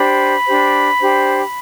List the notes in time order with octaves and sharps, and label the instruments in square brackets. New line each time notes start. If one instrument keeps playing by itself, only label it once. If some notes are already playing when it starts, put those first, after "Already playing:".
Already playing: [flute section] D4 G4 C5 B5
D4 G4 C5
D4 G4 C5